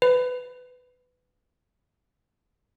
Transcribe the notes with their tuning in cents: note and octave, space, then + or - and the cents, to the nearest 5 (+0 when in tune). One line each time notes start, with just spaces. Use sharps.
B4 +20